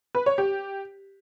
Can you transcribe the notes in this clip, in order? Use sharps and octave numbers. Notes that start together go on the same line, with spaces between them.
B4
C#5
G4